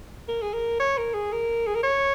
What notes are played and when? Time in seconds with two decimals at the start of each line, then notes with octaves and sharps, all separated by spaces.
0.28 A#4
0.42 G#4
0.53 A#4
0.80 C#5
0.98 A#4
1.14 G#4
1.32 A#4
1.67 G#4
1.75 A#4
1.83 C#5